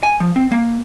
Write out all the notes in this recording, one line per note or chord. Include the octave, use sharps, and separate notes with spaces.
G#5
F3
C4
A#3